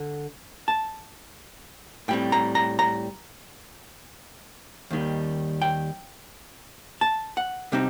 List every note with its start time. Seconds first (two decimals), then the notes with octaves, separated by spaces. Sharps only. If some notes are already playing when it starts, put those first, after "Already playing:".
Already playing: D3
0.68 A5
2.08 A2 G3 C4 G5
2.32 A#5
2.55 A#5
2.79 A#5
4.91 D#2 D#3 G3
5.62 G5
7.01 A5
7.37 F#5
7.72 C3 G3 C4 D#4